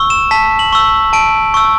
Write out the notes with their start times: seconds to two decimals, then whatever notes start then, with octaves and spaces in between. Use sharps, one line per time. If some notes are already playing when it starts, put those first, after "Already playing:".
Already playing: C#6 E6
0.10 E7
0.31 A5 B6
0.59 F#7
0.73 C#6 E6
1.13 A5 D7
1.54 C#6 E6